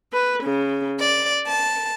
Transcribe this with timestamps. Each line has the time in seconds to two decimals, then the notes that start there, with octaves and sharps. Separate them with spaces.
0.13 B4
0.44 C#3
0.99 D5
1.47 A5